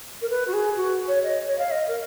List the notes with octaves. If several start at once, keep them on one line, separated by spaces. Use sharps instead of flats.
A#4
B4
F#4
G#4
F#4
C#5
D#5
C#5
F5
D#5
A#4